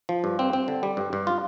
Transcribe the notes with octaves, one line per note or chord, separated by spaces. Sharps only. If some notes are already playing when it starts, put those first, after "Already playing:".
F3
G2
C4
C4
D3
G3
G2
G2
F4